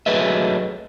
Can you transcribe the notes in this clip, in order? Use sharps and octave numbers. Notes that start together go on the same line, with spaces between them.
F#3 A3 G#4 B4 D#5 E5